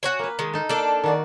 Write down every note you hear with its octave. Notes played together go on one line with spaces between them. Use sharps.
F#4 C#5 G#5
A#3 B4
D#3 G#3
D#4 A4
A#3 D4 A4
D#3 F#4 D5